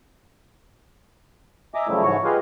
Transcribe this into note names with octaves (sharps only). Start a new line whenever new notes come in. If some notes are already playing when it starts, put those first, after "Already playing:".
D#5 E5 G#5 A#5 D6
F#2 C#3 F3 G3 A3 E4
G#2 E3 F#4 C#5 C#6
F4 G4 G#4 B4 D#5 F5